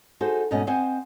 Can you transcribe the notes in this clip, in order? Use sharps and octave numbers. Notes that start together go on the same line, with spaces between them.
D#4 F#4 G#4 A4 C5
G#2 B2 A3 C#4 D#5
C4 C5 D#5 F#5 G#5